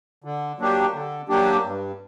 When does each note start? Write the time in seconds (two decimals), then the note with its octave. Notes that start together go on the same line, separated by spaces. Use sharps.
0.24 D3
0.58 F#3 A#3 D4 G4
0.93 D3
1.29 F#3 A#3 D4 G4
1.64 G2